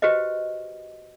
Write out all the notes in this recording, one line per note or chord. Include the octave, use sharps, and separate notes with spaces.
F#4 G4 B4 C5 D#5